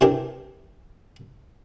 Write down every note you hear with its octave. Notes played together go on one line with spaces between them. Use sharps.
C3 E3 D4 G4 G#4 A#4